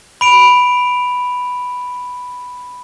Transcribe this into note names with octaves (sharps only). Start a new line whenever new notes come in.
B5 D7 F7